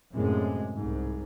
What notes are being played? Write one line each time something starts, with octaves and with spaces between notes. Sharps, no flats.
F#2 A2 C3 G#3
C2 G#2